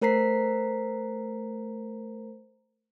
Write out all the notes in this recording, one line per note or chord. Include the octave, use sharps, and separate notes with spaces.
A3 A#4 C5 A#5 B6 C7